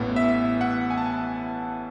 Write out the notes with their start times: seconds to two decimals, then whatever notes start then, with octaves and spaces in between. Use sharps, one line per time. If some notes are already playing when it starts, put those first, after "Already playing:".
Already playing: A1 A2 E3 B3
0.16 E5
0.61 F#5
0.90 G#5
0.98 A5
1.06 G#5